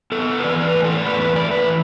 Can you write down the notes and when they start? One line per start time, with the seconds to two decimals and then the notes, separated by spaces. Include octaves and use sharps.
0.12 B3 A4
0.39 B4
0.43 E3 D5
0.63 B4
0.73 A2
0.84 A4
0.97 D5
1.05 E2 B4
1.20 B4
1.36 A3 D5
1.51 B4
1.66 E3